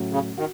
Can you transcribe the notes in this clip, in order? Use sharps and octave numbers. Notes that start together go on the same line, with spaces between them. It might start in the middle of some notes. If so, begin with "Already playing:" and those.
Already playing: A2 F#3 C#4 F#4
C#3
D#3 F#4